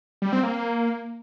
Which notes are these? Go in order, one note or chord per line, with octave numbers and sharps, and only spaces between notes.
G3
C4
A#3